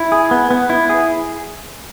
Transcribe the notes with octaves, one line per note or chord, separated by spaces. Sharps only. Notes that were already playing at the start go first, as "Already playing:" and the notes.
Already playing: E4
G#4
B3
B3
E4
G#4